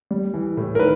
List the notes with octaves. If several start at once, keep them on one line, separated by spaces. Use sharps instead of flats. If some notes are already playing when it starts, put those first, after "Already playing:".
G3
E3
A2
A#4
D#3 B4